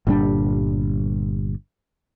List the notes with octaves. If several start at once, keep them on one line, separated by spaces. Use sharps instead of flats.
G1 A#2 G3 D4